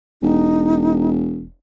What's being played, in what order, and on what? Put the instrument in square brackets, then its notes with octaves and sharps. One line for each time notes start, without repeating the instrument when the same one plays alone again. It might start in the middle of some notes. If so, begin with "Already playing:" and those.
[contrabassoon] E1 [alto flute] D#4